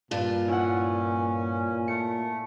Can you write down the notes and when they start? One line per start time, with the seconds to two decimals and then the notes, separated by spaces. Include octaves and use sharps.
0.11 G2 A#2 F4 A5
0.48 C#4 E4 F#5
1.88 A3 C#7